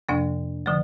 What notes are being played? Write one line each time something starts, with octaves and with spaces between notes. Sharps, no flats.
F2 C3 F3 A#3 D4
D3 F3 A3